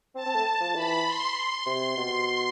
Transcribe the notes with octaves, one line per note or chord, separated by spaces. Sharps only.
C4 A5
C4
A3
F3
E3 B5
C6
C6
C3 C6
B2